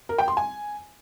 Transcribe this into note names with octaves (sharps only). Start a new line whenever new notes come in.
A#4
G5
C6
G#5